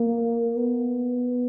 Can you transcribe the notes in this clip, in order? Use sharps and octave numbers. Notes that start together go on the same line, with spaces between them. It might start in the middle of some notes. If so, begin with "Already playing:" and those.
Already playing: A#3
B3